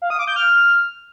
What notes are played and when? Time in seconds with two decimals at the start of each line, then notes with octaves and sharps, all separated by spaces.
0.02 F5
0.10 D#6
0.19 D6
0.27 G6
0.36 F6